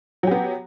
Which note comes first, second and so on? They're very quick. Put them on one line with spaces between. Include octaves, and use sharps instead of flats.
F#3 G4 B3